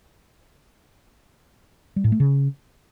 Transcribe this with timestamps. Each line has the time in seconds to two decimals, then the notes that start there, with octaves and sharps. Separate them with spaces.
1.96 G3
2.04 A2
2.12 A3
2.20 C#3